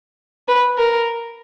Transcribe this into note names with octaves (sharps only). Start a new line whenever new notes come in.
B4
A#4